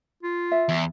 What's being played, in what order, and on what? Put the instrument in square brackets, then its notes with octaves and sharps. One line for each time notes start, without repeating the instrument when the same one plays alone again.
[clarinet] F4
[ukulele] E5
[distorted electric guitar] E2